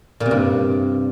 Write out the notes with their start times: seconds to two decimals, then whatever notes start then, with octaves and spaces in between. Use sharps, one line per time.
0.20 A#2
0.26 C3
0.31 G2